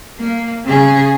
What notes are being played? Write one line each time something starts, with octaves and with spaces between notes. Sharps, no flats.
A#3
C#3 G#4